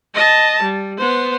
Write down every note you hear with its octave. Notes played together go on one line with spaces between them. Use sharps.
D#5 A5
G3
B3 C5